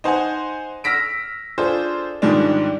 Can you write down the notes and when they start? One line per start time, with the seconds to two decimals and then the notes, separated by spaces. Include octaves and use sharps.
0.04 D#4 C5 F#5 G#5
0.84 E6 F6 A#6 B6 D7
1.58 D4 F4 G#4 A4 C5
2.22 G#2 D#3 F3 G3 G#3 D4